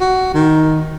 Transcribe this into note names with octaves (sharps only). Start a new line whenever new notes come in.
F#4
D#3